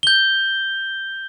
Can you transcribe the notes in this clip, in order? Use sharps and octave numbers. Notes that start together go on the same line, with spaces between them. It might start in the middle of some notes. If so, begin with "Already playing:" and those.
G6 G7